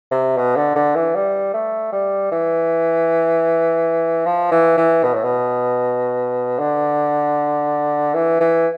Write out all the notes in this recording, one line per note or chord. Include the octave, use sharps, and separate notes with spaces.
C3
B2
D3
D3
E3
G3
A3
G3
E3
F3
E3
E3
B2
A2
B2
D3
E3
E3